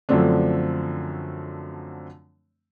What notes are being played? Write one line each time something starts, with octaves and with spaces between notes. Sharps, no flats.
F#2 D3 F3 A3 C4 D4